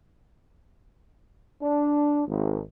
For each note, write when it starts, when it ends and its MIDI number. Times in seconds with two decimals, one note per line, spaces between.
1.62 2.23 62
2.28 2.62 32